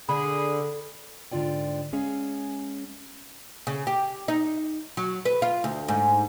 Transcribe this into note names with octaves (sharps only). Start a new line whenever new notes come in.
D3 G#4 B5
G#2 D3 D#3 F4 D5 G5
G#3 C#4 G#4 F5
C#3
G4
D#4
F#3
B4
F4
D2
G#2